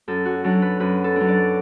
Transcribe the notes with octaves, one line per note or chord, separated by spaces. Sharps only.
F#2 A4
F#4
F#3 D4 A4
B4
F#2 B4
A4
F#3 D4
D5